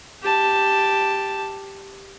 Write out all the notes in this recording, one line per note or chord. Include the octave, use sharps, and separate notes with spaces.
G4 A5